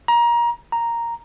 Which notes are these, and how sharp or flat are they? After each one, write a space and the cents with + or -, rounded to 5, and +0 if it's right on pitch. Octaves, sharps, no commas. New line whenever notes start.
A#5 +25
A#5 +0